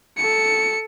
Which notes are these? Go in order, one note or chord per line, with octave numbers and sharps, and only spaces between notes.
A4 C#7